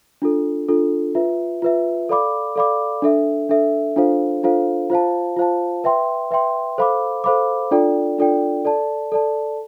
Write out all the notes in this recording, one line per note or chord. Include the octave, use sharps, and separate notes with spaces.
D4 F4 A4
D4 F4 A4
F4 B4 E5
F4 B4 E5
A4 D5 F5 B5 D6
A4 D5 F5 B5 D6
D4 A4 E5
D4 A4 E5
D4 F4 A4 C5 F5
D4 F4 A4 C5 F5
F4 C5 F5 A5
F4 C5 F5 A5
B4 E5 G5 C6
B4 E5 G5 C6
A4 C5 F5 B5 D6
A4 C5 F5 B5 D6
D4 F4 A4 D5 G5
D4 F4 A4 D5 G5
A4 D5 A5
A4 D5 A5